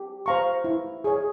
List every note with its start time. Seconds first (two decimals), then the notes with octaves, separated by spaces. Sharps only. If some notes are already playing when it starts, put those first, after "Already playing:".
Already playing: G4
0.26 C5 F5 A#5 C#6
0.64 E4
1.04 G#4 C#5